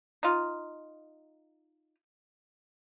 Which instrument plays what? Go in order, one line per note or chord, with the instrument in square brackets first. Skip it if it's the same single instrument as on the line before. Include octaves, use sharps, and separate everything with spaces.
[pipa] D#4 F4